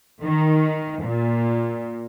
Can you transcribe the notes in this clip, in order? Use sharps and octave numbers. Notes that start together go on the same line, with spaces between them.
D#3
A#2